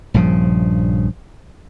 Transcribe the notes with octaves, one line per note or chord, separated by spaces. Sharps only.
A#1 G2 C#3 F3